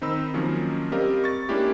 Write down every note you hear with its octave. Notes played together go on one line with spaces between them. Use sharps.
D#3 C4 D#4 B5 E6
D#3 F3 F#3 A#3 C#4
G3 C4 G4 A#4 D#5 F5
C#6 A6
G#3 A#3 C#4 D4 E4 G4